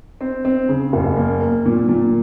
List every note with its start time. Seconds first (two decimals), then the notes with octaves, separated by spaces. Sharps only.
0.21 C4
0.45 C4
0.69 C#3
0.93 F#1
1.17 A#3
1.41 A#3
1.66 A#2
1.89 A#2